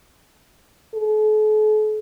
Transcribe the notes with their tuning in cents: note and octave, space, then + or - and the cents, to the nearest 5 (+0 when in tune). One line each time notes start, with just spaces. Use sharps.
A4 -45